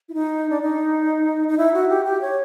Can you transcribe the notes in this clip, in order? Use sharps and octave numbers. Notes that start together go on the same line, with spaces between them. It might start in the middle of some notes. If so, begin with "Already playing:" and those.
E4
D#4
D4
D#4
D#4
E4
F#4
G4
G4
C#5